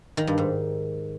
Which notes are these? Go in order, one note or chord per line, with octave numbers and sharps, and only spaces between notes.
D#3
G2
G#2